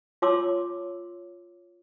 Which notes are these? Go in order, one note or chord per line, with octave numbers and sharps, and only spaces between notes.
F4 C#5 A5 C6 D6 E6